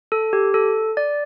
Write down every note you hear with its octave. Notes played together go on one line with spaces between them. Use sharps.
A4
G4
A4
D5